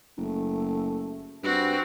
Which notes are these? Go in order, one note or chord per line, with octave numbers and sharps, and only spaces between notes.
F#1 A3
G2 C4 F#4 B4